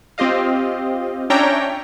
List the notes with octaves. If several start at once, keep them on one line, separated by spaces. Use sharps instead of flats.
C4 F4 G4 D#5 F5
C#4 D4 C#5 E5 G5 A#5